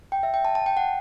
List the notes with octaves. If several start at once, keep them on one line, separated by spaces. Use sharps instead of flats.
G5
E5
G5
A5
A5
G5
F#5